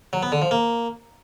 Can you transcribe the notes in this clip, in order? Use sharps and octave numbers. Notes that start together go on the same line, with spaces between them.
F#3
B3
D3
F3
A#3